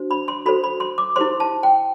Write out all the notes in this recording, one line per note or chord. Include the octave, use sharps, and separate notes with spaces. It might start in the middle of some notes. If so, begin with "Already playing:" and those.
Already playing: D4 F#4 C5
B5
C6
F#4 A4 C5 B5
B5
C6
D6
E4 G4 C5 C6
A5
G5